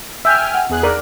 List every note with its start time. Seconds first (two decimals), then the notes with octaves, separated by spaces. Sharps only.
0.25 E5 G5 G#5 E6 F6 G6
0.54 F#5
0.69 E2 G#4 F#6
0.83 A#4 D5